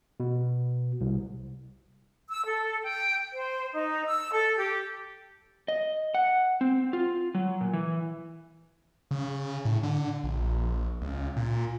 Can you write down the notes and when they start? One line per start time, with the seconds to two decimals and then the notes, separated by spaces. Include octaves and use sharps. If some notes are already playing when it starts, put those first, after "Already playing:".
0.20 B2
1.01 C2
2.31 E6
2.46 A4
2.84 G5
3.33 C5
3.73 D#4
4.05 E6
4.32 A4
4.57 G4
5.68 D#5
6.14 F#5
6.61 C4
6.93 F4
7.35 F#3
7.61 A#2
7.73 E3
9.11 C#3
9.65 A2
9.83 D3
10.24 A#1
11.02 C#2
11.37 A#2